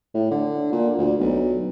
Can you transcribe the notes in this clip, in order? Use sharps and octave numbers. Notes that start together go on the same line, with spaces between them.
A2
D3
A#2
D2
B1